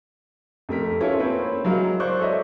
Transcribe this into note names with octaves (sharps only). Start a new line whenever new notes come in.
F2 A3 A#4 B6
C#4 E4 F4 A4 B4 C#5
A#3 C4 B4 C#5
F#3 G#3 E4 A#4 F5
C5 D5 C#6 F#6
A4 A#4 C#5 D#5 E5